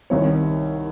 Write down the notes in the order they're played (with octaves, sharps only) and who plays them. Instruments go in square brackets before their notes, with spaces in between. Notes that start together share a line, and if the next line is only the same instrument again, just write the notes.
[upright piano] C2 C3 D#3 C#5